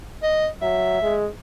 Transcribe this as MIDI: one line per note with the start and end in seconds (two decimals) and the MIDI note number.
0.23 0.48 75
0.62 0.98 54
0.62 1.15 76
1.02 1.28 56